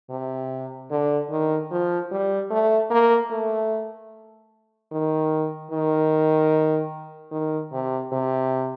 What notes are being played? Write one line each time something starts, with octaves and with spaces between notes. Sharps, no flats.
C3
D3
D#3
F3
G3
A3
A#3
A3
D#3
D#3
D#3
C3
C3